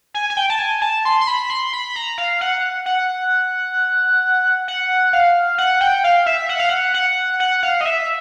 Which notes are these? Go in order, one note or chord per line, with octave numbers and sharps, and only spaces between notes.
G#5
G#5
G5
A5
G#5
A5
C6
C6
B5
C6
B5
A#5
F5
F#5
F#5
F#5
F5
F#5
G5
F5
E5
F#5
F5
F#5
F#5
F#5
F5
D#5
E5